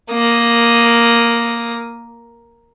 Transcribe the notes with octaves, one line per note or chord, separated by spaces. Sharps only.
A#3 D#6